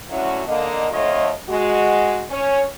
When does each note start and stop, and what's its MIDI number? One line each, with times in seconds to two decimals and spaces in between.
0.10 0.42 50
0.10 0.42 54
0.10 0.42 57
0.10 0.42 61
0.10 0.42 64
0.10 0.42 66
0.48 0.87 50
0.48 0.87 58
0.48 0.87 75
0.91 1.30 41
0.91 1.30 50
0.91 1.30 57
0.91 1.30 65
0.91 1.30 73
0.91 1.30 75
1.49 2.22 56
1.49 2.22 66
2.31 2.62 61
2.31 2.62 73